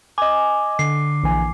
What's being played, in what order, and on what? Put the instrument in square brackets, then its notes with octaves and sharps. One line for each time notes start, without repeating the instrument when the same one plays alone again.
[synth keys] D#5 G#5 [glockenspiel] D6
[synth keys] D3 [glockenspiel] C7
[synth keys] A#1 E3 G#5